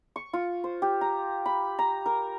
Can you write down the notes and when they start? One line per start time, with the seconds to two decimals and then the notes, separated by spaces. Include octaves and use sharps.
0.16 C#6
0.33 F4
0.64 C5
0.82 G4
1.01 A#5
1.46 B5
1.79 A#5
2.06 A#4